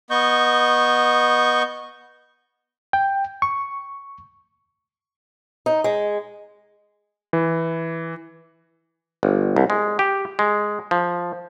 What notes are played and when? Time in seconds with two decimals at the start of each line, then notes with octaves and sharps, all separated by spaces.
0.11 B3 D#5 C#6 G6
2.93 G5
3.42 C#6
5.66 D#4
5.84 G#3
7.33 E3
9.23 G1
9.56 C2
9.70 G#3
9.99 G4
10.39 G#3
10.91 F3